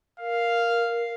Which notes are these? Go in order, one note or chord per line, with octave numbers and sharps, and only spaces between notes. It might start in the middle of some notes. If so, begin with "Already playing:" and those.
A#4 F5